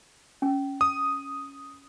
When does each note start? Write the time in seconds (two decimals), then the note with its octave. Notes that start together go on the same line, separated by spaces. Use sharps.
0.42 C#4
0.81 D#6